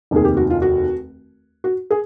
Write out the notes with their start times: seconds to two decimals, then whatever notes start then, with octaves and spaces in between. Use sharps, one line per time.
0.11 F1 D#2 D#3 G#4
0.25 G4
0.37 F#4
0.50 F4
0.62 F#4
1.64 F#4
1.90 G#4